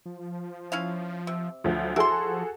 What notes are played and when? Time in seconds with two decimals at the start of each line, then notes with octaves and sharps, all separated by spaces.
0.06 F3
0.72 C#4 E4 F5
1.27 C3
1.64 D2 F3 F#3
1.96 F3 E4 F#4 G#4 A4 C6